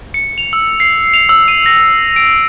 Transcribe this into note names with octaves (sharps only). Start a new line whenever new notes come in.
C#7
F7
E6
C7
F7
E6
D#7
A#6
D7